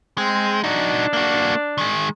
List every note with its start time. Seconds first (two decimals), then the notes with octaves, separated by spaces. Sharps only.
0.18 G#3 C4
0.64 D4 D#4 F#4
1.13 A#3 F#4
1.78 D#3 G#3